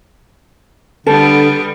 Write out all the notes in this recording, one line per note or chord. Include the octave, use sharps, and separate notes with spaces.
D3 G3 B3 A4